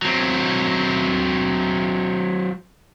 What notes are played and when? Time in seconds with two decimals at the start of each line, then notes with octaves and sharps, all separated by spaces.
0.02 F#3 C4